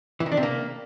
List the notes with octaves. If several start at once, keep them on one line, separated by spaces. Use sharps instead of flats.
E3
D#3
D4
C3
A#3